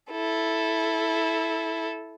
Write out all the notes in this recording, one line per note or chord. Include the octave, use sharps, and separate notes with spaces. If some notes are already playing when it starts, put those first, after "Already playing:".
E4 A4